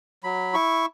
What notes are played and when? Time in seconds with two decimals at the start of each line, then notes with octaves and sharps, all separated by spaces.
0.24 F#3 B5
0.54 E4 C#6